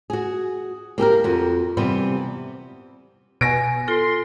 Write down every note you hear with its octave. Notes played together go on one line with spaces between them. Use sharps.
F#4 G#4
A#3 G4 A4 A#4
F2 F#4
C3 E3 G3 B3
B2 G#5 A#6 D7
F4 A4 C6